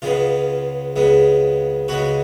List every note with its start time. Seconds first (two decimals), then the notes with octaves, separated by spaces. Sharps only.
0.02 C#2 C#3 G#3 B3 F4
0.96 C#2 C#3 G#3 B3
1.88 C#2 C#3 G#3 B3 F#4